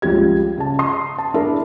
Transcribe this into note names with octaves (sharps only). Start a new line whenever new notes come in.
C#2 F3 G3 G#6
C#3 A5
C6 D#6 C7
A5
D4 E4 G#4 A#4 E5